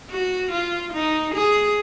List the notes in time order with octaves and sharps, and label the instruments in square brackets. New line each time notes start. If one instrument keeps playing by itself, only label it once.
[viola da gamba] F#4
F4
D#4
G#4